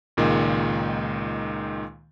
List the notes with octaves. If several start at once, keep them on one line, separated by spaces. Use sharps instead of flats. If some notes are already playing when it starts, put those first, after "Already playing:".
C#2 A#2 D#3 G#3